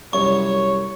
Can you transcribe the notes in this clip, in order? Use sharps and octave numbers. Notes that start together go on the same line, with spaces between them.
C2 F#2 C#5 C#6